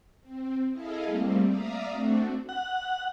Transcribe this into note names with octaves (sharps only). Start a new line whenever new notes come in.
C4
E4 G#4 A4 D#5 F5
G3 A3 A#3 C4
D5 E5 F5 A#5 D#6
A3 C4 D4 F#4
F#5